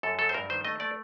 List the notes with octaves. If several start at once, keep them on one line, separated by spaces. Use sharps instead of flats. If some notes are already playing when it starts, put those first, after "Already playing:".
F#2 A4
F#3 A4
C5
G2 A#4
D#3 C5
A3 D#5
A3 D5